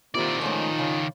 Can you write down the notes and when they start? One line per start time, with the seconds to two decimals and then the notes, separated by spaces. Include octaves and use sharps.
0.15 C3 D#3 A#3 E4 F4 D5 A#5
0.41 F3 G#3 A3 C#4 D#4
0.78 C#3 F5